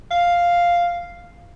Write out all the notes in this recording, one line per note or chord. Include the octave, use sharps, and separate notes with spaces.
F5